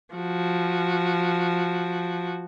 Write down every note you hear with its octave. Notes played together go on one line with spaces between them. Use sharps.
F3 F#4